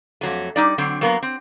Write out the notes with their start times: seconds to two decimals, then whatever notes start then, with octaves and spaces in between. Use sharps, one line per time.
0.21 F2 F#3 A3
0.56 G3 D#4 D5
0.78 D3 F#3 C4
1.01 F#3 A#3 B3
1.22 C4